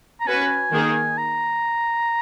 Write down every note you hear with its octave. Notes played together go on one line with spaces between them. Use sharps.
A#5
C#4 F#4 B4 G#5
D#3 A#3 D#4 G#4
A#5